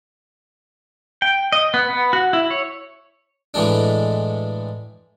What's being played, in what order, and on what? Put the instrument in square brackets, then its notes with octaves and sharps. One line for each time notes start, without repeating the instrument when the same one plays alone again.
[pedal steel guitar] G5
D#5
B3
B3
F#4
E4
C#5
[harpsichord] A2 E3 G#3 D4